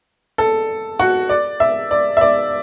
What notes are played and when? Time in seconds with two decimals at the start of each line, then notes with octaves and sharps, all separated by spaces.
0.38 A4
0.99 F#4
1.29 D5
1.60 E5
1.91 D5
2.17 E5
2.21 D5